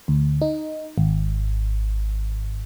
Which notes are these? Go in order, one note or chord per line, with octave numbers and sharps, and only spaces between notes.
D2
D#4
G#1